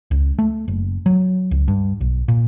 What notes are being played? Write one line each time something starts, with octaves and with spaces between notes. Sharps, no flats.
C#2
A3
F#1
F#3
C#2
G2
B1
A#2